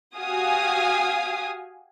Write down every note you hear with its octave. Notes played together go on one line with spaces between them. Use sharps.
F#4 G4 F5 G#5 D#6